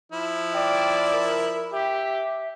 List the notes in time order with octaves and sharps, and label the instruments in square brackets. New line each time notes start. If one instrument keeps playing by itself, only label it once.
[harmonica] F3 E4
[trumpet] D5 [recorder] G5
[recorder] A#4
[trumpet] G4 [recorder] E5